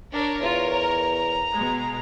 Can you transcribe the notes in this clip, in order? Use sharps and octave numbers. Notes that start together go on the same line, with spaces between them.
D4 A#4 C#5
E2 F4
A#5
B2 G#3